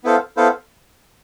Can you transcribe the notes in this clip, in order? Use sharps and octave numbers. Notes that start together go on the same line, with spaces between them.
B3 E4 A4 C5 F5
B3 E4 A4 C5 F5